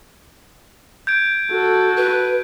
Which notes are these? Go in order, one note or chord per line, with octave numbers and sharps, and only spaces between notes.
G6 G#6 D7
F#4 A4
B4